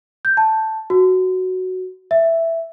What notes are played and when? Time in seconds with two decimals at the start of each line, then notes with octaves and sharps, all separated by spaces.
0.25 G6
0.37 A5
0.90 F#4
2.11 E5